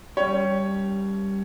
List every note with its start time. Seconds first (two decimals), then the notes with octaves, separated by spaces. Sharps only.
0.17 G3 C#4 G4 C#5